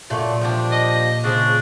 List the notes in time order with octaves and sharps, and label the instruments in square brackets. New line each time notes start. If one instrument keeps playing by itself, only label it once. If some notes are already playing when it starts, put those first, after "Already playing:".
[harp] A#2 [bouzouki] F#3 A3 D5
[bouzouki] F3 G3 D4
[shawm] D#5
[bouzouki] C#3 C5 [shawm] D4